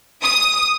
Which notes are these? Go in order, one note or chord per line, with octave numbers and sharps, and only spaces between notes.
D#6